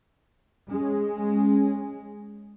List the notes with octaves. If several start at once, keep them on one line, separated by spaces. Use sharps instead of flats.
G#3 C#4 G#4